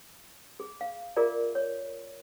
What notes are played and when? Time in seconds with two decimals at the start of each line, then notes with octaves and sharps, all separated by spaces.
0.60 G#4
0.81 F5
1.16 F4 G#4 A#4 D5 E5
1.55 C#5